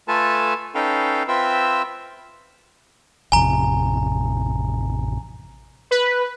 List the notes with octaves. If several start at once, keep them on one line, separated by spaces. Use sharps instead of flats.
A3 F4 A4 B4 G#5 A5
C#4 D#4 A4 B4 F5 G5
C4 F4 B4 E5 G5 E6
A1 F2 C3 G#5 A#5
B4